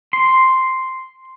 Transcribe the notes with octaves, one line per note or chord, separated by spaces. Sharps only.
C6